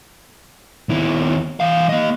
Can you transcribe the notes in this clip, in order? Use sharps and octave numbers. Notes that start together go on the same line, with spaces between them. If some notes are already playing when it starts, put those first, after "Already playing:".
D#2 E4
E3 F5
A#3 D#5